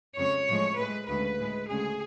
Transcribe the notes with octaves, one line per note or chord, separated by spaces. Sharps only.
F2 C#3 G#3 C#5
A2 F3 G#3
A2 G#3 B4
D2 C#3 G#3 B4
A2 G#3
D2 C#3 G#3 G#4